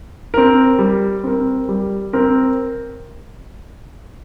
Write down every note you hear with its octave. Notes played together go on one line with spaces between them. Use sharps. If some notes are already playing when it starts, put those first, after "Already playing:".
C4 A#4
G3
C4 A#4
G3
C4 A#4